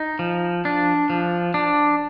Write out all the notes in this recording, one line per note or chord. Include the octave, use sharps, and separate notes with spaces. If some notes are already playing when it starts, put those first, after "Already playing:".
Already playing: D#4
F3
D4
F3
D4